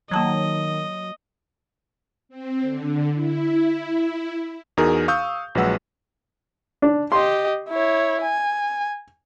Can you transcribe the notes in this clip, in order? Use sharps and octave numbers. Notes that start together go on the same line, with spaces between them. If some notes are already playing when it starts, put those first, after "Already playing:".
D#3 F#3 A#3 D#5 A5 A#5
C4
D3
E4
E2 D#4 F#4 G#4 A#4
F5 C#6 D#6 E6 G6
A#1 F#3 G#3 B4 F#5 E6
D4
G4 D#5 C6
E4 C#5
G#5